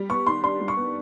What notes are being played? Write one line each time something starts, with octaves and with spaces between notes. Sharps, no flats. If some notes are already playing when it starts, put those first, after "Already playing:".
Already playing: G3
B3 C#6
D#3 C6
D4 C6
G3
C#6
B3